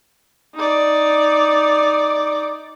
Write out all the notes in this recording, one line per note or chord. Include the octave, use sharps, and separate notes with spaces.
D#4 D5